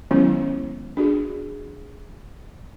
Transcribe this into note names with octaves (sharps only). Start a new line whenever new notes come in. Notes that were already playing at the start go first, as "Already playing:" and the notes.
D#3 F#3 G#3 B3 C#4 E4
D4 F#4 G#4